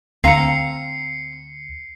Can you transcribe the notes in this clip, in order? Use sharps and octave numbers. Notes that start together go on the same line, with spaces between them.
D2 C4 F5 A#5 C7 C#7